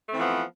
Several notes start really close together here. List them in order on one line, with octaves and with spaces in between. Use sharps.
A3 C4 E3 F3 B3